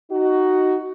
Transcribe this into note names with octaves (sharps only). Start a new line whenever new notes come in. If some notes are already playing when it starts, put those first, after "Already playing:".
D#4 F#4